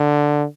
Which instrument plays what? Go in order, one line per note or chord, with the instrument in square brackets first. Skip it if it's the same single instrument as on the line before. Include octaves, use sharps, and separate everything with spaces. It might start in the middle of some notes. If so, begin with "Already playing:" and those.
Already playing: [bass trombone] D3